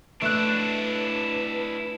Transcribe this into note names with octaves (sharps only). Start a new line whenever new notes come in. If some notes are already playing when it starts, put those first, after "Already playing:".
A3 D4 E4 B4 F#6